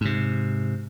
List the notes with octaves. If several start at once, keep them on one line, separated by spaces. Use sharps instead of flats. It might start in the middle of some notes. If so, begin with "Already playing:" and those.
G#2 C3